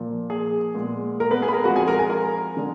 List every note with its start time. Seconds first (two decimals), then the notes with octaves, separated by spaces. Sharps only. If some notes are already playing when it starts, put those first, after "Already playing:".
Already playing: A#2 F3 A#3
0.30 G#4
0.75 A#2 G#3 B3
1.20 A#4
1.31 B3 B4
1.42 G#4 G#5
1.48 B5
1.53 A#4 A#5
1.64 F2 F3 G#3 F#4 F#5
1.76 G#4 G#5
1.88 A#4 A#5
1.99 G#5
2.09 A#4 A#5
2.57 D3 G#3